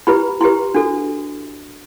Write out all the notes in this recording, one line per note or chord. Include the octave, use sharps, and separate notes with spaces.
E4 G4 B4 B5
E4 G4 B4 C6
D4 F#4 A4